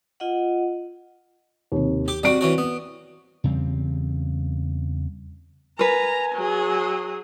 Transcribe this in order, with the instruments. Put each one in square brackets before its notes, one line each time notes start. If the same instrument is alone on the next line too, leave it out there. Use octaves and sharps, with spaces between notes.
[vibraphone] F4 D#5 F#5
[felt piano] D#2 C3
[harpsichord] G4 D6
[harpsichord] G3 F#4 [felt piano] C4 D7
[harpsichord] E3 C#4 F#4
B3
[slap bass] E2 C#3 G3 C4
[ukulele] A#4 B4 [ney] G#5 [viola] A#5
[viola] F#3 G#4